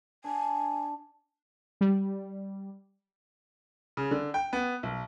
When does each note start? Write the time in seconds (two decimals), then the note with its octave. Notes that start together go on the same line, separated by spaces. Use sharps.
0.24 D4 G#5
1.81 G3
3.97 C#3
4.11 D3
4.34 G5
4.53 B3
4.83 B1